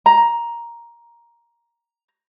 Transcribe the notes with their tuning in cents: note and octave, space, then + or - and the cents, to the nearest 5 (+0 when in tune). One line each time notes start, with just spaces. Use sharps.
A#5 +10